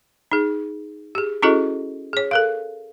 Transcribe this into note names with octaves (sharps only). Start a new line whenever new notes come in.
D#4 G#4
G4 G#4
C#4 E4 F#4 G#4 A4 D#5
G#4 C#5
A4 A#4 F5